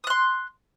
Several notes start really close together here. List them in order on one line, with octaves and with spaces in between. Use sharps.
D#6 F#6 C6